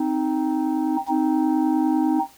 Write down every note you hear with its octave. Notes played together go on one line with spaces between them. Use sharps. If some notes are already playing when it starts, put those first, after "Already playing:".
Already playing: C4 D#4
C4 D#4